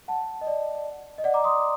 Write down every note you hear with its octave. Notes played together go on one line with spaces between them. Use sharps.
F#5 A5
D#5
D5
D#5
D5 F#5
A#5 D6
C6 D#6